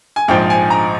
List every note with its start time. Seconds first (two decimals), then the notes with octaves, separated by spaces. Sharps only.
0.16 G#5
0.28 A#1 G#2 F3 G5
0.50 G#5
0.70 A#5